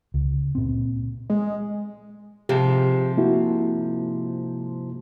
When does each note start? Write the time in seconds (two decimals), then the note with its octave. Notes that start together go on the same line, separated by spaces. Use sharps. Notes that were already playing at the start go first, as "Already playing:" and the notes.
0.14 C#2
0.55 A#2 C4
1.30 G#3
2.49 G#2 C3 F3 G4
3.17 A#3 E4 F#4